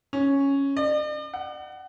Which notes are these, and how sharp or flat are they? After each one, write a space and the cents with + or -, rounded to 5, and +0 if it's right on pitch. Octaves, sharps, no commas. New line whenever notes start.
C#4 +0
D5 +45
F#5 +25